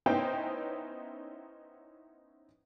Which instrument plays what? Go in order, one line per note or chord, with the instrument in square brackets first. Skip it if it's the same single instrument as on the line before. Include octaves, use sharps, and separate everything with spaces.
[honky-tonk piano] B3 C#4 D#4 E4 C5 G5